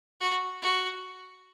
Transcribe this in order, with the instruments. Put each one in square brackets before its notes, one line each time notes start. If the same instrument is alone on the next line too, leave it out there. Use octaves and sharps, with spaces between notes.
[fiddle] F#4
F#4